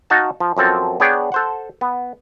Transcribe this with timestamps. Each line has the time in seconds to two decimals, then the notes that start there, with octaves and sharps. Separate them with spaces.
0.10 D#4 F#4 F5 F#5 A5
0.40 F3
0.57 F#2 F3 C4 A4
1.00 B3 D4 G#4 C#5 D5 G5
1.32 A4 C5 F#5
1.81 B3